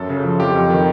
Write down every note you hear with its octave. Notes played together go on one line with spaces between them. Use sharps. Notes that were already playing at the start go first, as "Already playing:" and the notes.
Already playing: F#2 A4
C#3
F3
F2 G4
F2
D#3